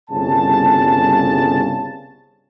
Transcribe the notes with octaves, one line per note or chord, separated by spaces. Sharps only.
G1 C2 C#3 A5